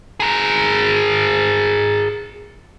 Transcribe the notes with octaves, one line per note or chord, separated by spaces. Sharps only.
G#4 A#4